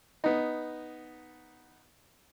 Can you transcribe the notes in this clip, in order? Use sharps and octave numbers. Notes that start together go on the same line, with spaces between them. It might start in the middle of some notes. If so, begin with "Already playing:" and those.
B3 D#4